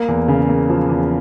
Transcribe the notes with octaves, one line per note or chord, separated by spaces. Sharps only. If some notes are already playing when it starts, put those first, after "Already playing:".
Already playing: A#3
E2
C#3
A#3
F3
E2